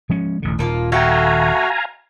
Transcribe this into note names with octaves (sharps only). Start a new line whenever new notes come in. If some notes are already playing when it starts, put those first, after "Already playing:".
F3 G#3 C#4
E1 A1 D3
D#1 D#3 F3 A#3 F4
A3 F#4 F5 G5 G#5 A#5